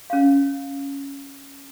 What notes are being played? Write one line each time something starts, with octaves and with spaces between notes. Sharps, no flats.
C#4 F5